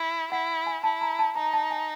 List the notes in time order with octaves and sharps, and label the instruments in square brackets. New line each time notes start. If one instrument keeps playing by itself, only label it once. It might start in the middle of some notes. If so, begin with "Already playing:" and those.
Already playing: [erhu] E4
[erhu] E4 [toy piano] F#5
[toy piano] G#5
[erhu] E4 [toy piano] A5
[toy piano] A#5
A5
[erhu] D#4 [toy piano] A#5
[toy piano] A5
G#5